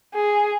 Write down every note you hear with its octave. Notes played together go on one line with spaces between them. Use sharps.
G#4